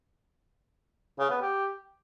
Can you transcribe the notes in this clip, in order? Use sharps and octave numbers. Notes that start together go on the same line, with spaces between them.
C#3
B3
G4